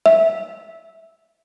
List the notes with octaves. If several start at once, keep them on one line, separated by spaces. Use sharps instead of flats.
E5